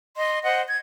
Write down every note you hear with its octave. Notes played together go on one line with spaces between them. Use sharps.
D#5 C6
C5 D#5 F#5
G#6